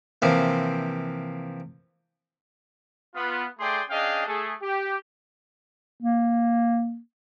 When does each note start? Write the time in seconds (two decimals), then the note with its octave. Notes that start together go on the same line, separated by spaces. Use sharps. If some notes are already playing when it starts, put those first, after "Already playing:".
0.22 C3 E3 F3 A#3 C4
3.15 B3 F4
3.60 A3 G#4 D5 G5 C6
3.90 C#4 D4 G#4 D#5 F5 G5
4.27 A3 G#4 A4
4.62 G4
6.01 A#3